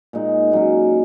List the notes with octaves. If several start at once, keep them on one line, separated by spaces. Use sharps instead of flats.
A#2 G#3 D#4
A#2 F#3 C#4